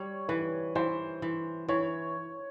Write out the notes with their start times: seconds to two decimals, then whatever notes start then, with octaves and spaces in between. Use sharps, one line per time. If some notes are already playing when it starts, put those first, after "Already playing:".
Already playing: G3 C#5
0.29 E3 B4
0.75 E3 C5
1.22 E3
1.68 E3 C#5